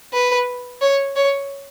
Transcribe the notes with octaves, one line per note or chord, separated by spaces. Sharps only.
B4
C#5
C#5